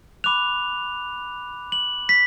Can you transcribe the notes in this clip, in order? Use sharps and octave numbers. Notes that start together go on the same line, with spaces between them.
B5 D6 F#6 F7
F#7
B6